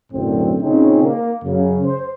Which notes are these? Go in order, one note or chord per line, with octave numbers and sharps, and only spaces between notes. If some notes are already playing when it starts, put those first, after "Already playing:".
B1 F#2 A2 D3 C4
A#2 C#3 C4 C#4 D#4
A#3
F#2 C#3
C5